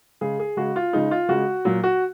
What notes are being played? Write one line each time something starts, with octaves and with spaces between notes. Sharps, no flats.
C#3 G#3 G#4
G#4
C#3 G#3 F#4
F4
C#3 G#3 D#4
F4
C#3 G#3 F#4
A#2 F#3
F#4